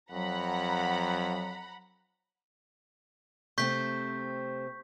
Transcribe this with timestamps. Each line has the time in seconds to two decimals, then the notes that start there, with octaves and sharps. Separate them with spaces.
0.12 F2 F#3 F#5 A#5 B5
3.58 C3 A3 C4 C#6 G6 B6